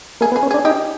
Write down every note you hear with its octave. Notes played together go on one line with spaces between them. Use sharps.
A#3 G#4
B3
G#4
C#4
D4 G#4
D#4 G4